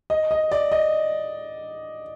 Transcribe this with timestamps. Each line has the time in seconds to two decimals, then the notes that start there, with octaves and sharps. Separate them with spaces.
0.10 D#5
0.31 D#5
0.52 D5
0.72 D#5